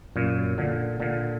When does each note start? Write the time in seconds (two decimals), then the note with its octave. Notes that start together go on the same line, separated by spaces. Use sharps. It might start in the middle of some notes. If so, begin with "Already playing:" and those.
0.16 F#2 A#2
0.58 A#2 D3
1.00 A#2 D3